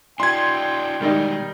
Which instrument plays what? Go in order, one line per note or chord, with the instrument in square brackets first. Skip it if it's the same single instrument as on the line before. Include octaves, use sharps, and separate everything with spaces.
[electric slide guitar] D4 E4 F#4 [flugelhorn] G5 [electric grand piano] C6 G#6
[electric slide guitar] B2 G#3 B3 [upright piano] D#3 G3 D#4